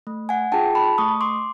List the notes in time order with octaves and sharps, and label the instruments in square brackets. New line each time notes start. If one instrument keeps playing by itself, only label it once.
[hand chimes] A3
F#5 G#5
D4 F4 G#4 G5 A5
A5 B5
A3 C#6 D#6
C6 D6